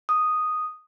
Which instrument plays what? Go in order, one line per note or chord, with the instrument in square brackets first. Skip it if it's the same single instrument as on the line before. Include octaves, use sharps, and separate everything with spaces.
[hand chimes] D#6